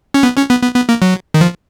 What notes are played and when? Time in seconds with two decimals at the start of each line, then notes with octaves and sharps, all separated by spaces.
0.14 C#4
0.23 B3
0.37 C#4
0.50 B3
0.62 B3
0.76 B3
0.89 A#3
1.02 F#3
1.34 D#3
1.41 F3